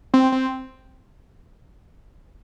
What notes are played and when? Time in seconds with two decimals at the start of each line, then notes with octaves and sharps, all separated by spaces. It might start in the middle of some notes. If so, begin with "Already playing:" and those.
0.14 C4
0.32 C4